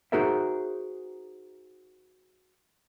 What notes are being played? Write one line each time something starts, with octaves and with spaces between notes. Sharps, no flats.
D#4 F#4 G#4 A#4 C5 E5